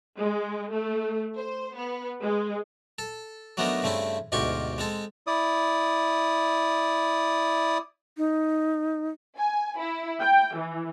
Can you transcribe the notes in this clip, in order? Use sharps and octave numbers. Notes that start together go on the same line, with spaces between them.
G#3
A3
C5
B3
G#3
A4
F#3 A3 B3 D4 D#4 A#4
G2 C#3 A3 C4 C#4 E4
D2 G#2 B2 F4 G4 C#6
G#3 C4 A4
E4 D5 D#6
D#4
G#5
E4
G5
E3